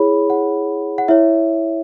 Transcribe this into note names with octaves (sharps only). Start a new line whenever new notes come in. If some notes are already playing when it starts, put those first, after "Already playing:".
Already playing: E4 G#4 C#5 B5
F#5
F#5
E4 C#5 E5